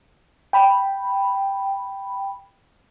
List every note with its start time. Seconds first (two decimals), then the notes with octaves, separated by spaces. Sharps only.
0.53 G5 B5